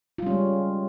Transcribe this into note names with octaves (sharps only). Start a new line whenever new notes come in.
G3 G#3 C#4 F4